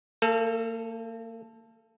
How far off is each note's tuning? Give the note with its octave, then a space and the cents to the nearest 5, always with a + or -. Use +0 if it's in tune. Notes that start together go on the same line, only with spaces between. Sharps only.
A#3 -40 A4 +0